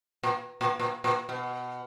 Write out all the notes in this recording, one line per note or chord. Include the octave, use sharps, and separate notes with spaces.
A#2
A#2
A#2
A#2
B2